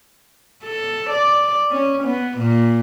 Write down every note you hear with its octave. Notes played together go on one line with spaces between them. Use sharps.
A4
D5
C#4
B3
A#2